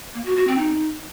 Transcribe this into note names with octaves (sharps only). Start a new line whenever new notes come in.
A#3
F#4
F#4
C4
D#4